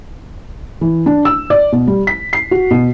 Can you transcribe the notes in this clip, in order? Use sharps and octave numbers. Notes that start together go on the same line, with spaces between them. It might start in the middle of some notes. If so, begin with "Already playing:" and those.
E3
D4
E6
D5
B2
G3
B6
C7
F#4
B2